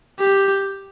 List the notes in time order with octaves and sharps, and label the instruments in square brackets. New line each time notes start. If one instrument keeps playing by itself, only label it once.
[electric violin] G4